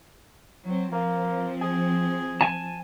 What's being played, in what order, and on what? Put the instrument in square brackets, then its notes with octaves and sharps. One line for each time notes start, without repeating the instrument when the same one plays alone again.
[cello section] F#3 C4
[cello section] F3 C4 [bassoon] A#3
[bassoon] G#4
[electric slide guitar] G#5 A5